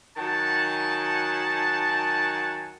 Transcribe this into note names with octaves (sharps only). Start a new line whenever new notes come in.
D#3 F#3 F#5 G#5 A5